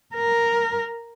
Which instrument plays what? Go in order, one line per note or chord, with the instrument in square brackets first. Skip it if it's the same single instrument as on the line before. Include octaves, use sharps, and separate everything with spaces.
[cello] A#4